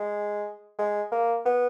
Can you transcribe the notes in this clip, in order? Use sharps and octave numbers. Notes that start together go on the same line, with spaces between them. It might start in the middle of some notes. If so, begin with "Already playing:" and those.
Already playing: G#3
G#3
A#3
B3